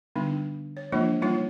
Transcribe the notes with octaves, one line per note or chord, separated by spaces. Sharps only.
D3 G3 B3 D4 D#4
C#5
E3 F3 G#3 A#3 D4 F4
G3 A#3 D#4 F4 C#5